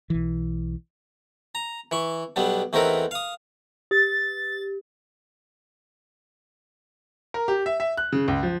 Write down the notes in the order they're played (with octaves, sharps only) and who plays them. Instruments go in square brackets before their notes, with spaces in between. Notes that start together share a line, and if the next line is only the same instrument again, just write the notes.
[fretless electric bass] B1 E3
[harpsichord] A#5
E3 C#6
B1 G3 B3 D4
E2 A3 C4 D#4 A#4 B4
F5 D#6
[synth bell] G4 [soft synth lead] A6
[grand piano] A#4
G4
E5
E5
F#6
C#3
C#2
F3